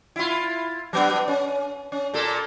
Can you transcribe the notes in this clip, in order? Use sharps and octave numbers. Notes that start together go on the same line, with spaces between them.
E4 F4
F#3 B3 D4
C#4
C#4
A#2 A#3 A4